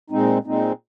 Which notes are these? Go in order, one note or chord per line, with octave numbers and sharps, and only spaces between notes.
A#2 G#3 C4 D#4
A#2 G#3 C4 D#4